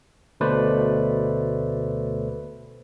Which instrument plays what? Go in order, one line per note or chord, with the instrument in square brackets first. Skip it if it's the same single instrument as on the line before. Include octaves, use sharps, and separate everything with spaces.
[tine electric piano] D2 B2 A3 B4 C5 D5